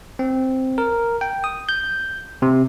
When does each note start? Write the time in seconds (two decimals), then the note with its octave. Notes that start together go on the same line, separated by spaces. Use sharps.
0.19 C4
0.78 A#4
1.21 G5
1.44 D#6
1.69 G6
2.42 C3